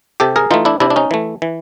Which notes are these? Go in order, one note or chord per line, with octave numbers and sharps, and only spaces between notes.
C3 G4 A4
G#4 A#4
E3 A3 D#4 F4
D4 E4
C3 D4 E4
D4
C#4 D#4
E3 A3
E3